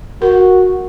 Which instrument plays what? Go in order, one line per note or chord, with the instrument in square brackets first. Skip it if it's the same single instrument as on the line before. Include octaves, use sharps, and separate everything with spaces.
[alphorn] F#4 [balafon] A#4